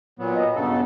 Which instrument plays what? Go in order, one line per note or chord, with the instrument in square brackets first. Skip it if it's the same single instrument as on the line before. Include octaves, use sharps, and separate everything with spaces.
[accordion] A#2 F#3 B3
[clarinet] D#5
[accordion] G2 C#3 A4 [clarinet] B3